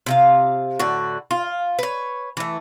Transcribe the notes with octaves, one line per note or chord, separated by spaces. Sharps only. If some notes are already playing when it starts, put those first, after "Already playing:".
C3 F4 F5
A2 D3 F#4
F4
B4 C#5
E3 A3